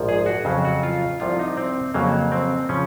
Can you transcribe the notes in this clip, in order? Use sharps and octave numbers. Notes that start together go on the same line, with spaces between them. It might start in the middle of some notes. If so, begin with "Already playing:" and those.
Already playing: A#1 G#2 F3
G#4
F#4
F2 C#3 F#3
F#4
F4
C2 C3 F3 F4
D#4
C4
F2 C#3 F#3 A#3
C4
C#3 F3 C#4